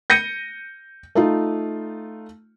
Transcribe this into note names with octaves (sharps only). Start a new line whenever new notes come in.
G6 A#6 C#7 D#7
A3 D#4 F4